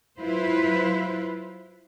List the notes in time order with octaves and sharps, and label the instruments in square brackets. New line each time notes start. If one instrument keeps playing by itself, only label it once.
[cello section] F#3 E4 F4 B4 C5